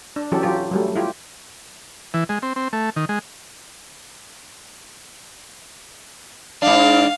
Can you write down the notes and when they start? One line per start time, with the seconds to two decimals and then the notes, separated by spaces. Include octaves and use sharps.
0.16 D4
0.32 E3 F#3 C#4 G4 A4
0.43 F#3 F4 G4
0.71 F#3 G3 A3
0.96 E4 F4 G4
2.14 E3
2.29 G#3
2.42 C4
2.56 C4
2.73 A3
2.96 D#3
3.09 G#3
6.62 G#2 D4 F5